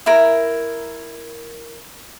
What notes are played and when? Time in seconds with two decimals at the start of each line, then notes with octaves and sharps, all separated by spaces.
0.06 E4 A#4